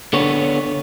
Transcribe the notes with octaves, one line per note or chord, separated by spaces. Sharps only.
D3 B3 C#5